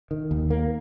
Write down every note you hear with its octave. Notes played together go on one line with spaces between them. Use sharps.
D#3
D#2
A#3